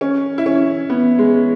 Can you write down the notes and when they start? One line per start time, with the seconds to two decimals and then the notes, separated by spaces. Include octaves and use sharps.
0.01 C#4
0.38 E4
0.46 C#4
0.90 B3
1.19 G#3